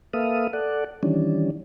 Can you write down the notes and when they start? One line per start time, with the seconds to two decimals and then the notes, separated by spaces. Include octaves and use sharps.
0.13 A#3 A4 B4 E5 F5 D#6
0.53 A4 D5 F#5
1.03 D#3 E3 G3 C#4 D4